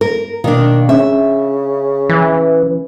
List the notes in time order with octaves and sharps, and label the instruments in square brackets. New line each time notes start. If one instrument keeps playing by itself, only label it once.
[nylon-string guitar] A#4
[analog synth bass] B2 [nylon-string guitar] D#3 D4 [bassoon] A#3
[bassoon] C#3 [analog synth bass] C#4 [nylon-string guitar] E5
[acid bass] E3